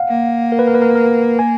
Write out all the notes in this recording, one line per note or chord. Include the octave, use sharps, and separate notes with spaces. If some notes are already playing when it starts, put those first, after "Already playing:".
Already playing: F5 F#5
A#3
A#4
B4
A#4
B4
A#4
A#4
G#5